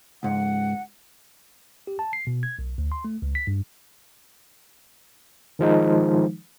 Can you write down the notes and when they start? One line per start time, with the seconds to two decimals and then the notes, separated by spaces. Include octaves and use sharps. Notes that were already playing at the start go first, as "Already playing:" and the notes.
0.23 C#2 G#2 F#5
1.87 G4
1.99 A5
2.13 C7
2.27 B2
2.43 G#6
2.59 B1
2.78 D2
2.92 C6
3.05 A3
3.22 C#2
3.35 B6
3.47 G2
5.59 D#3 F3 G#3 D#4